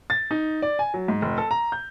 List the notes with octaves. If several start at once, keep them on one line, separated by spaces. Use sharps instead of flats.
A6
D#4
D5
G#5
F#3
G#2
F1
A4
A#5
G6